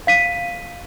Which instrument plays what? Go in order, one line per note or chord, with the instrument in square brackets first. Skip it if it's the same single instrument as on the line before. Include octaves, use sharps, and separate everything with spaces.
[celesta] F5 B6 D#7